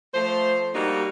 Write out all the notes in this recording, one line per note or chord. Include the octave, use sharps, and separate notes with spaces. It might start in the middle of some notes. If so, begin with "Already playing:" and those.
F3 A3 C5
G3 A#3 D#4 F#4